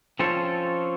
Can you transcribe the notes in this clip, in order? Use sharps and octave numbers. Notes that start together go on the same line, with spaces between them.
F3 C4 C#4 A4 C5 C#5